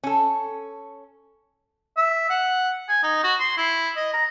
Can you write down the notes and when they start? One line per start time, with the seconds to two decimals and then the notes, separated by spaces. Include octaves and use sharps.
0.04 C#4 A4
1.97 E5
2.30 F#5
2.89 G#5
3.03 D#4
3.23 F#4
3.40 C6
3.57 E4
3.96 D#5
4.13 A#5